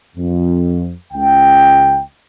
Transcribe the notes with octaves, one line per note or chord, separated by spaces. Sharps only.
F2
C#2 G5